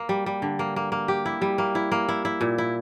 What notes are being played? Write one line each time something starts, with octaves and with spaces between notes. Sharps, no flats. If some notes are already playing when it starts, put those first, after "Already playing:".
Already playing: A#3
G3
G3
D3
A#3
A#3
A#3
G4
E4
G3
A#3
E4
A#3
E4
E4
A#2
E4